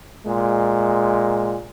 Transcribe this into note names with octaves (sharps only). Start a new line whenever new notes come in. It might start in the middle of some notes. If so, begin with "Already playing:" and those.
A#2 G#3